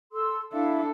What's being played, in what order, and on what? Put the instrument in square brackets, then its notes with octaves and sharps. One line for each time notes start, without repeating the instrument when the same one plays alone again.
[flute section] A4 C6 E6
[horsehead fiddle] D4 A4 [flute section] E4 E5 F5